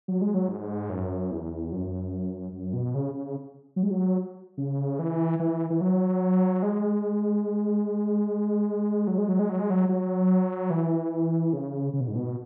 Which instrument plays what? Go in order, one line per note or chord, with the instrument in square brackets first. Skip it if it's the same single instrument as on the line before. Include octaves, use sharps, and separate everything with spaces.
[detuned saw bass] F#3
G#3
F#3
G#2
F#2
E2
F#2
F#2
B2
C#3
C#3
F#3
G#3
F#3
C#3
E3
E3
E3
F#3
G#3
F#3
G#3
F#3
G#3
F#3
G#3
F#3
F#3
E3
C#3
C#3
B2
G#2
B2